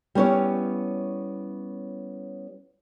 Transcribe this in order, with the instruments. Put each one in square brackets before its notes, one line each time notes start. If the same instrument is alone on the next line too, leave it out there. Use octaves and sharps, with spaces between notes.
[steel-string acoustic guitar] G3 B3 C#4 E4 C#5